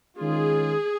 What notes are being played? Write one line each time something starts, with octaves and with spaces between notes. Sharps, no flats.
D#3 G#3 C#4 F4 G#4